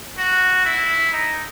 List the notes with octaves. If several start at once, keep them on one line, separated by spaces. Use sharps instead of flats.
F#4
E4
D#4